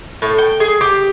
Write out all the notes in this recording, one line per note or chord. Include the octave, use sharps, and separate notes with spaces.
A2
G5
G#4
G4